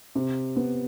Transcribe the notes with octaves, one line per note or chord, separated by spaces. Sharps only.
C3
B3